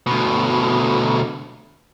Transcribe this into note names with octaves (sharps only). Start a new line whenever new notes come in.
D2 B2